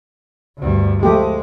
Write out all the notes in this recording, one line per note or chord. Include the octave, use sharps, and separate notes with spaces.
D2 G2
F3 G#3 A3 G4